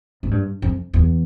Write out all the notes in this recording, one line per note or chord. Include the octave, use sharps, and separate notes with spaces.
G#2
G2
F2
E2